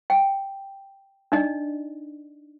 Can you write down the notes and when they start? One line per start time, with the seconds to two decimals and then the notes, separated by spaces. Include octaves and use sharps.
0.10 G5
1.32 D4 D#4 D5 D#5